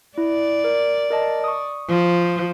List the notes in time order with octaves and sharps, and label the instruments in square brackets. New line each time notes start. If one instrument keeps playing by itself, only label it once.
[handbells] E4 [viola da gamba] D5
[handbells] A#4
A#4 D#5 A5
C#6 D#6
[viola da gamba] F3